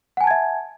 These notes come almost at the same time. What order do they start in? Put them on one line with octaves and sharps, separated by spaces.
F#5 G#5 A5 G#6 E5